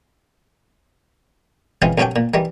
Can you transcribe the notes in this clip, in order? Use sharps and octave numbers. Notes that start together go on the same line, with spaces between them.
C#3 E3 G#3 C4 F4
C2 G2 F#3 C#4 D4 G5
A#2
D#3 E3 G3